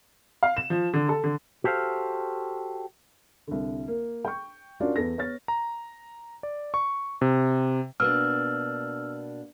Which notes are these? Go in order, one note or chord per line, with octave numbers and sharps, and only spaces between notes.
F5
E7
F3
D3
A4
D3
F#4 G4 A4 C5 F5
C2 D3
A#3
G5 C#6
C#4 D4 F4 F#4 A#4 D5
E2 A4 B4 A#6
B3 C#5 F6 A6
A#5
D5
C#6
C3
B2 A#3 D4 E6 F6